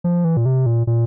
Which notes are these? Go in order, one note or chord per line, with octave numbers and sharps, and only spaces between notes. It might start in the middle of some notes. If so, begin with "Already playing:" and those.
F3
E3
A#2
C3
A#2
A#2